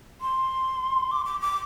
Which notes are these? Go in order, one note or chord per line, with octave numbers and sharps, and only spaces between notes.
C6
D6
D6
D6